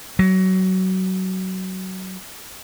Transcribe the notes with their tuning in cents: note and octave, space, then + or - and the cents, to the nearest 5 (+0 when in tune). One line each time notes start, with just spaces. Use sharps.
F#3 +20